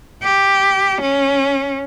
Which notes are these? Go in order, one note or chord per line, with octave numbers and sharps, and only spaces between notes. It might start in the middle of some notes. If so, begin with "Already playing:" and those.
G4
C#4